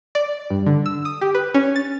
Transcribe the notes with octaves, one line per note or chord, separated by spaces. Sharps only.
D5
G2
D3
E6
D#6
G4
B4
C#4
A6